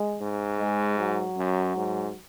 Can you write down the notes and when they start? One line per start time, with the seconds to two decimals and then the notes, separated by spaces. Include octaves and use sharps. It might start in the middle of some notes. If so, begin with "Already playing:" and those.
Already playing: G#3
0.21 G#2
0.60 G#3
0.99 F#3
1.37 F#2
1.76 G#2